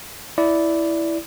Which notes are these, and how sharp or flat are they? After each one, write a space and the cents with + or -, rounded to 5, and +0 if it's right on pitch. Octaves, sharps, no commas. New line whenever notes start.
E4 +0 D5 -10